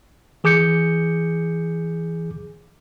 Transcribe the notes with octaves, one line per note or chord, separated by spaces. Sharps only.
E3 G#4 D6 G6 C#7